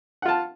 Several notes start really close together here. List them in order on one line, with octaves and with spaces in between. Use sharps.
F#5 F4 A5